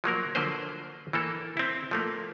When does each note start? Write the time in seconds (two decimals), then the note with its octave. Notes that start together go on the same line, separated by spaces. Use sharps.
0.04 F3 F#3 A#3 A#4
0.35 D3 F3 F#3 A#3 B4 C5
1.13 E3 A#3 A4
1.57 C4 E4
1.91 F3 A3 A#3